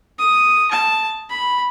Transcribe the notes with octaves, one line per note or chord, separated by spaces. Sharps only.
D#6
A5
B5